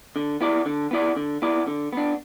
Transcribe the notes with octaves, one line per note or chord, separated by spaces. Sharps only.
D3
B3 E4 D5
D3
B3 E4 D5
D3
B3 E4 D5
D3
B3 D4